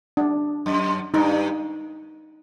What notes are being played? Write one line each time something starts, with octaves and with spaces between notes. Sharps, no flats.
D4
F#2
G2 D#4